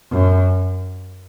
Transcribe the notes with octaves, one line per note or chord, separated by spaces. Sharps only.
F#2